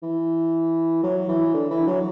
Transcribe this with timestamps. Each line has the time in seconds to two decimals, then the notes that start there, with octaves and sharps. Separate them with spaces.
0.03 E3
1.03 F#3
1.29 E3
1.54 D3
1.70 E3
1.87 F#3